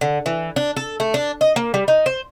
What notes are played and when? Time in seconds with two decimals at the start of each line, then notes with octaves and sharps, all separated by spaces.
0.01 D3
0.26 E3
0.56 D4
0.77 A4
1.00 A3
1.14 D4
1.41 D#5
1.56 A#3
1.74 G3
1.88 D#4
2.06 C5